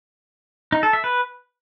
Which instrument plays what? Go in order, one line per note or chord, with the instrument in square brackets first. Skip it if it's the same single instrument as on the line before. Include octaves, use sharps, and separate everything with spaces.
[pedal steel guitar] D#4
A4
E5
B4